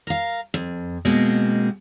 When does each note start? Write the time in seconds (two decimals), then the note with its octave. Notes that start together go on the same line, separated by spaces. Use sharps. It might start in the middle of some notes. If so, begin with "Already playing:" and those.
0.07 A#4 F5
0.54 F2
1.05 B2 G#3 A#3 C4